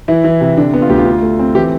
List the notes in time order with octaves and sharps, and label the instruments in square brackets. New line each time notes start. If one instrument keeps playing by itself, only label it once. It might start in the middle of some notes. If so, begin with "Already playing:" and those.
[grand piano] E3 E4
E3
C3
D3 D4
B3
F4
D2 G4
F4
D3
A3
C4
E3 G4